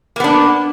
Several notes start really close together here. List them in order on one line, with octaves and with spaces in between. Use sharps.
A#3 B3 D4